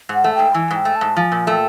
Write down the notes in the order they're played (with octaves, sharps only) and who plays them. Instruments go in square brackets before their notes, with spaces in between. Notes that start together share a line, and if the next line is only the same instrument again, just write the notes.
[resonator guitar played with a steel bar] G#2 [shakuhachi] F#5
[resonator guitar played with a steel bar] A3
[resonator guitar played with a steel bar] G#2 [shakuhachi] G5
[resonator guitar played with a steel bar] E3 [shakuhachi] G#5
[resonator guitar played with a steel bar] G#2
[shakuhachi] G5
[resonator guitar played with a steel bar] A3
[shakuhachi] A5
[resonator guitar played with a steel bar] G#2
[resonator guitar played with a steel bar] F3 [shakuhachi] G#5 A5
[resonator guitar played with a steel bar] A#2
[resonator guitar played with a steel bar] A3 [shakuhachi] G#5
[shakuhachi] G5